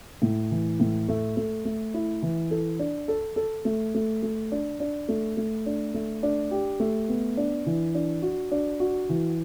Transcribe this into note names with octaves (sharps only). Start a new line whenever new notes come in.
A2
E3
A2
A3
A3
A3
E4
E3
A4
D4
A4
A4
A3
A3
A3
D4
D4
A3
A3
D4
A3
D4
G4
A3
B3
D4
E3
D4
F#4
D4
F#4
E3